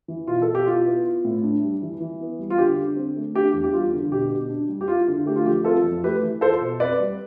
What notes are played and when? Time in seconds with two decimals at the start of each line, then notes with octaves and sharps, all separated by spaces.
0.08 E3
0.27 B2 F4
0.42 B2 A4
0.55 G4
0.66 E4 F4
0.85 B3
1.05 F4
1.25 A2
1.43 D4
1.63 G3
1.82 E3
2.00 E3
2.20 B3
2.39 G3
2.50 F4
2.58 D3 G4
2.77 D3
2.96 C4
3.16 A3
3.34 D4 G4
3.54 E2
3.64 G4
3.73 G3 F4
3.93 D3
4.11 B2 G4
4.31 B2
4.49 D4
4.69 G3
4.81 G4
4.88 E4 F4
5.08 D3
5.26 A3 G4
5.36 F4
5.46 F3 G4
5.64 C4 F4 A4
5.84 F2
6.04 A3 G4 B4
6.23 E3
6.41 F4 A4 C5
6.61 B2
6.80 C4 B4 D5
7.00 G3